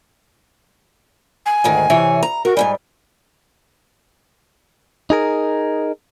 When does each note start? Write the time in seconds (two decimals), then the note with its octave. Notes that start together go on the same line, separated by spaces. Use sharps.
1.46 G#5
1.64 D2 G#2 D#3
1.90 C3 E3 C#5
2.23 A#5
2.45 F#4 A#4
2.57 G#2 B2 G3 G#5
5.10 D#4 G#4 A#4